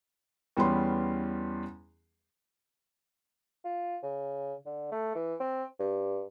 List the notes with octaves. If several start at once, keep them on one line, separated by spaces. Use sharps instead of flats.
E2 G3 B3 C#4 C6
F4
C#3
D3
A3
E3
C4
G2